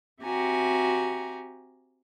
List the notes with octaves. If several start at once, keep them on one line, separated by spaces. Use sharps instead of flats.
C4 F#4 G4 E5 G#5 A#5